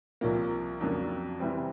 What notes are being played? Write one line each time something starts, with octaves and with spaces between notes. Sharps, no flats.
C2 C3 F3 A#3
F2 C#3 F#3 A#3 D4
C3 E3 G3 C4